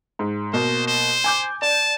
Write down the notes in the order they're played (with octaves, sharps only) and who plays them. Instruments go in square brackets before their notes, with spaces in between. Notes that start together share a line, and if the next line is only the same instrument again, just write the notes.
[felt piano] G#2
[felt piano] B2 A#3 [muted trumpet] C5
[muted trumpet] C5
[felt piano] G#5 D6 G6
[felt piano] D5 [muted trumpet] A5